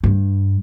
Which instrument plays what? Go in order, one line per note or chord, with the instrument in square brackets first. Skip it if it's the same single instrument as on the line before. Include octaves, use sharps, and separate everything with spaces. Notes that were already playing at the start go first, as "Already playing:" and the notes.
[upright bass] G2